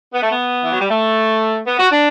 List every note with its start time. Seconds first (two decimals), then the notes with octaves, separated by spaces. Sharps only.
0.14 B3
0.23 A3
0.31 B3
0.64 E3
0.72 F#3
0.81 G3
0.91 A3
1.67 B3
1.79 F#4
1.91 D4